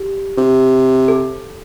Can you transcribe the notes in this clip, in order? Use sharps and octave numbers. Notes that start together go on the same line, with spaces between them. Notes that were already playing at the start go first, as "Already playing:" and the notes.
Already playing: G4
C3
A4